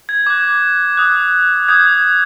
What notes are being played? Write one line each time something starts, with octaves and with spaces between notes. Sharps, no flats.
G#6
D6 F#6
D#6 F#6
D#6 G6 G#6